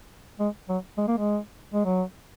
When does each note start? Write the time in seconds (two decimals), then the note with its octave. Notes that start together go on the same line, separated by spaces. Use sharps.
0.39 G#3
0.69 F#3
0.98 G#3
1.08 A#3
1.17 G#3
1.74 G#3
1.85 F#3